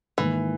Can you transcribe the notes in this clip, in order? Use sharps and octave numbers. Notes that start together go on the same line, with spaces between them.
G#2 D#3 E3 A#3